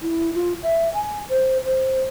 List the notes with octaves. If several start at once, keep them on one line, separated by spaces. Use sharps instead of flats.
E4
F4
E5
G#5
C5
C5